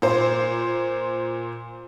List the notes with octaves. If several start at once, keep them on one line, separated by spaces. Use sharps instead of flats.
A#2 C5